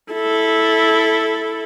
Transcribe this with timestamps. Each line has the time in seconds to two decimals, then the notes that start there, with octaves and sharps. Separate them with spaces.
0.13 E4 A4